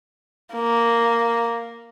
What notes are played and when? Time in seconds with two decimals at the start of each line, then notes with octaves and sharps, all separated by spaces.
0.53 A#3